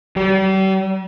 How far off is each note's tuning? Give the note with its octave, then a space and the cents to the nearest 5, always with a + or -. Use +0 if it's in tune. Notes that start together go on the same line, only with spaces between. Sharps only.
G3 -40